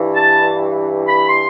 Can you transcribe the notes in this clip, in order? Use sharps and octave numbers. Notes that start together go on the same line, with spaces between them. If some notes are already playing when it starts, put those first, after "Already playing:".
Already playing: G2 E3
A5
B5
C6